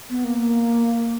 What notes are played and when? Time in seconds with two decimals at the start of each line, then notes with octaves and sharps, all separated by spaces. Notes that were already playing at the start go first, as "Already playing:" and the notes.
0.09 B3
0.24 A#3